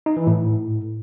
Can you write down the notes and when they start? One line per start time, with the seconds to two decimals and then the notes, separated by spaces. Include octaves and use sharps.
0.06 D#4
0.17 E3
0.27 A2